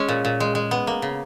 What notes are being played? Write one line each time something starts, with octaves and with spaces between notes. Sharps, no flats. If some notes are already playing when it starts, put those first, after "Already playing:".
Already playing: G#3 C#4
A#2
A#2
G#3
G#3
B3
A#3
C#3